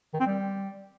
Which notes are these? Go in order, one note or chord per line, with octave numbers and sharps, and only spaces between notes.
D#3
C4
G3